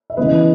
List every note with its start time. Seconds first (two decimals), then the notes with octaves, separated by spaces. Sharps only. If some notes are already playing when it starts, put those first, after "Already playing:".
0.10 E5
0.17 E2 C#3 E3 B4 D#5